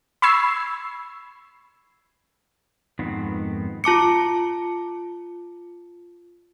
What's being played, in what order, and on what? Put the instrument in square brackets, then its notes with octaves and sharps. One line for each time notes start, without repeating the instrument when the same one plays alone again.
[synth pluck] B5 C#6 E6 G#6 C7
[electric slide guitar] F2 G#2 D#3 B3 C4
[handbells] F4 A5 D6 C#7